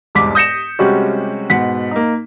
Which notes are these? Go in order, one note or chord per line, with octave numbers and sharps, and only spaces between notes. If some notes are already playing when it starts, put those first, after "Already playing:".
E1 C2 G#2 D6 B6
D#6 G6 A#6 C#7 E7
C3 G3 G#3 C#4 F#4
G#2 B2 F#5 B6
A#3 D#4